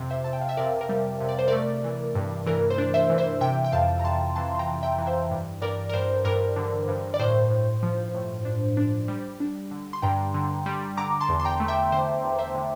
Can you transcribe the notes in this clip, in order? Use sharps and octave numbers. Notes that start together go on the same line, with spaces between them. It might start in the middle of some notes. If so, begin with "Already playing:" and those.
Already playing: F2 C3
C5 E5
F2 A5
G5
F5
E5
C3 A#4 D5
A#4
G3
C3
D5
C5
A3 A#4 D5
E3
G2
E3 A#4
C5
D4
C5 E5
E3
C5 E5
C3 E5 G5
G5
F2 F5 A5
A#5
F2 A5 C6
E3 A5 C6
C6
G5 A#5
E3
E5 G5
E3
C5 E5
G2
G2 A#4 D5
A#4
G2 C5
G2 A#4
D3
G2
D5
A2 C5
A2
F3
A2
D4
D4
G3
D4
D3
C6
G2 G5 A#5
D3
G3
D3 A#5 D6
A5 C6
E2
C6
G5 A#5
A3
E5 G5
D3 C5
E2
C5 E5
D3